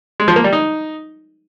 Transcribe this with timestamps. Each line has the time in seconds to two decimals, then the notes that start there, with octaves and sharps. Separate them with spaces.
0.20 G#3
0.28 F3
0.36 A#3
0.44 G3
0.53 D#4